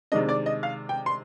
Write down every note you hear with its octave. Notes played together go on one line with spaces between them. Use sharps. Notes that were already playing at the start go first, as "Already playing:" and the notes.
C3 D#3 G#3 D4 D#5
D5
D#5
F5
G5
C6